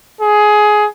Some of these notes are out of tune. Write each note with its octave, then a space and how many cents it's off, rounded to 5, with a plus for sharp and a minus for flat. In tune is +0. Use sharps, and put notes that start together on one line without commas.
G#4 +15